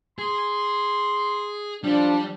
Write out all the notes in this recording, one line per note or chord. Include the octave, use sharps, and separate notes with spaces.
G#4 C6
F3 G3 D4